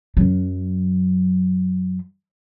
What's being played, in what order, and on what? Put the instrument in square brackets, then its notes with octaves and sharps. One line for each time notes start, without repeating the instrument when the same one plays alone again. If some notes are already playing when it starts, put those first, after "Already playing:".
[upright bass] F#2 F#3